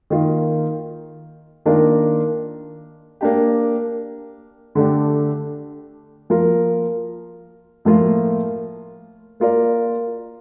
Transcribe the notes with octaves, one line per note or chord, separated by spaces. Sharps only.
D#3 A#3 F4
D#3 A#3 D4 F4 A#4
A#3 D4 G4
D3 A3 D4 G4
F3 A#3 F4 A#4
A2 F3 A#3 F4
A#3 F4 A#4 D5